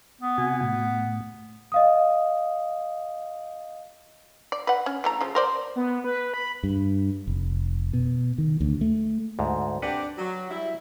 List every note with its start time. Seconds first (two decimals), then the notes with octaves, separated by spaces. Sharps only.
0.21 B3
0.38 C3 F#4 G#5
0.63 A2
1.72 D#5 F5 D#6
4.52 D5
4.67 B4 F#5
4.86 C#4
5.04 E3 A3 A#5
5.21 C#3 F3
5.35 A#4 C5 D5
5.76 B3
6.04 B4
6.34 B5
6.64 G2
7.27 F1
7.93 B2
8.38 D#3
8.61 D2
8.81 A3
9.39 D2 G#2
9.82 C4 D4 G4 B4 F#5
10.18 F#3
10.50 G3 E4